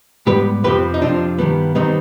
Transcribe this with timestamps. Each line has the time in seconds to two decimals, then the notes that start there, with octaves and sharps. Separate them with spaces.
0.27 G#2 G3 B3 G4 B4
0.64 F2 C3 F3 C4 G4 B4
0.94 D#4
1.01 F2 C3 F3 C4 D4 F4
1.38 G2 D#3 G3 B3
1.75 D#3 G3 B3 C4 D#4